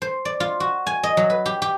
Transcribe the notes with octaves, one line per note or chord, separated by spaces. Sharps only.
C5
D5
F4
F#4
G#5
D#5
F#3
B4
G4
G4